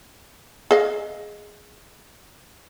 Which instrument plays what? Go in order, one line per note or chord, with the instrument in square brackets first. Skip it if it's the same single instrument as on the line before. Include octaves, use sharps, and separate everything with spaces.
[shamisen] G#4 D#5 F5